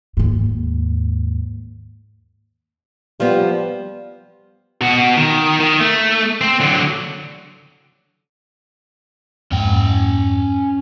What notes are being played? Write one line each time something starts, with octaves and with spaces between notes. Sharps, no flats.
D#2 G#2
F3 G3 B3
B2 F#4
D#3
D#3
A3
C4
D3 F#3
F2 G#2 C#4 G5